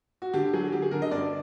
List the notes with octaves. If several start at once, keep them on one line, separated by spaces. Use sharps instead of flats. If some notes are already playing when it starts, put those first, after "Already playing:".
F#4
D3 G4
F#3 G#4
F#3 G4
G#4
D3 A#4
D#5
G2 D5